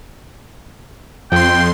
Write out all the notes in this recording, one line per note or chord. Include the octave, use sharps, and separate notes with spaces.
F2 G5 C6